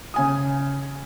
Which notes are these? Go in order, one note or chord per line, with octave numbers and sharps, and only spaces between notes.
C#3 G#5 D#6